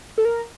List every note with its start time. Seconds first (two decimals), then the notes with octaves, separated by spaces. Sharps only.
0.18 A4
0.25 A#4